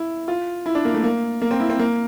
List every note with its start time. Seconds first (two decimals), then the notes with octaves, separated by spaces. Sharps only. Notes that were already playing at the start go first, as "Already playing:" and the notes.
Already playing: E4
0.28 F4
0.66 E4
0.75 D4
0.85 A#3
0.94 A3
1.04 A#3
1.42 A#3
1.51 C4
1.60 E4
1.70 C4
1.79 A#3